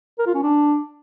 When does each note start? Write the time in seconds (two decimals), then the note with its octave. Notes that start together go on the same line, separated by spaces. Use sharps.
0.19 A#4
0.27 F4
0.34 C#4
0.42 D4